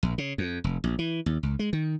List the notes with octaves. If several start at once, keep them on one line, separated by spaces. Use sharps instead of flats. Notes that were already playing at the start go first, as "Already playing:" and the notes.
A#1
C#3
F2
F1
A#1
E3
D#2
C#2
G#3
D#3